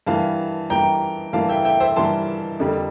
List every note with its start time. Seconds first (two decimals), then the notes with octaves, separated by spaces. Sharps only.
0.07 G2 E3 A#3 F5 A5
0.70 G2 E3 A#3 G5 A#5
1.33 G2 E3 A#3 F5 A5
1.49 E5 G5
1.65 E5 G5
1.80 C5 E5
1.96 G2 E3 A#3 A5 C6
2.59 F2 D3 G3 A#3